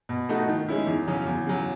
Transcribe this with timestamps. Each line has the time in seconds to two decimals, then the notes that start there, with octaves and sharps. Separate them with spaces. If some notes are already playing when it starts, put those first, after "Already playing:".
0.09 B2
0.29 A3 D#4 F#4
0.48 D#3
0.68 G#3 C#4 E4
0.87 E2
1.07 C#3 F#3 C#4
1.27 E2
1.47 C#3 F#3